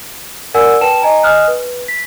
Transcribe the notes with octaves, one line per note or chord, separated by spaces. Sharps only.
A#4 D5 F#5 G#5 E6
B4 G5 A5 E7
D#5 G#5 A#5
D#5 G#5 D#6 F6 F#6
B4
B6